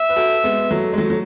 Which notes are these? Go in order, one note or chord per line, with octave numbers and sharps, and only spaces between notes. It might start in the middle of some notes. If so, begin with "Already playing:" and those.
Already playing: E5
B4
F#4 A4
G#3 B3
F#3 A3
G#3
F#3 A3
F#3